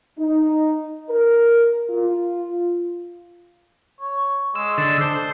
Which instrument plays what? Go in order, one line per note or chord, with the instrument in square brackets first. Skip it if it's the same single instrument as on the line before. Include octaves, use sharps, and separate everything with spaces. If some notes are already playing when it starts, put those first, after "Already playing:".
[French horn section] D#4
A#4
F4
[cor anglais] C#5
[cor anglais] G#3 [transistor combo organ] E6
[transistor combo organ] D3 E6
[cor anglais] D4 [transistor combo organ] C5
[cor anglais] A4